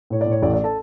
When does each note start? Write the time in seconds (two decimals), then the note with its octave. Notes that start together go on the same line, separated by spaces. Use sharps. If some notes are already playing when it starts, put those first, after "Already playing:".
0.10 A2 C#5
0.21 D5
0.26 A2
0.31 C#5
0.42 A1 D5
0.54 D5
0.64 A4 A5